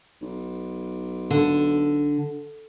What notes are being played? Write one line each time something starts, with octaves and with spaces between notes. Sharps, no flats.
B1
D3